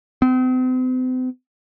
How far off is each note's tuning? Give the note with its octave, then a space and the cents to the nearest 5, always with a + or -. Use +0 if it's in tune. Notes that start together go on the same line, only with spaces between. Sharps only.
C4 -45